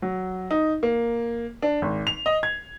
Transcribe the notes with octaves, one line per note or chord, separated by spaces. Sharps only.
F#3
D#4
A#3
D4
G#1
F7
D#5
G#6